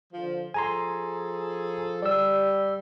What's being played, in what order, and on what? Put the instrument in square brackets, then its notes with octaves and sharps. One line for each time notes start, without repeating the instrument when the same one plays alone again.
[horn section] D3 F3
[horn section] F3 G#4 A4 [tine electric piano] G#5 A#5 C6
[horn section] G3 [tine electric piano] D5 E6